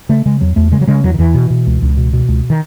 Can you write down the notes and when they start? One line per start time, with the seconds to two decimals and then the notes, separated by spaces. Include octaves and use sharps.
0.09 C#3 A3
0.26 C#3 G#3
0.41 E2 F#3
0.56 E2 A3
0.72 C#3 G#3
0.81 F#3
0.87 C#3 G#3
1.04 E2 F#3
1.14 D#3
1.19 E2 E3
1.34 B2
1.50 B2
1.67 C#2
1.82 C#2
1.97 B2
2.13 B2
2.29 C#2
2.50 D#3